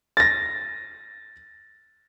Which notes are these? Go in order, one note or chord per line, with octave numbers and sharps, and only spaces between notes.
A6 A#6